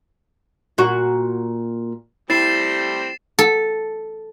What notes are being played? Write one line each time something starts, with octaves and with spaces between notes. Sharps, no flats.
A#2 F#4
G3 A3 C4 E4 A6 C7 E7
A4